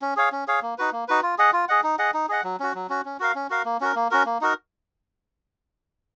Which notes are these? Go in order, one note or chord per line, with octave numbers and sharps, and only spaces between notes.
C#4
G#4 C#5 F5
C#4
G#4 C#5 F5
A#3
D#4 F#4 B4
A#3
D#4 F#4 B4
F4
G#4 D#5 F#5
F4
G#4 D#5 F#5
D#4
G#4 D#5 F#5
D#4
G#4 D#5 F#5
F#3
C#4 F#4
F#3
C#4 F#4
C#4
F#4 A#4 F5
C#4
F#4 A#4 F5
A#3
C#4 F#4 A#4
A#3
C#4 F#4 A#4
A#3
D#4 F#4 A#4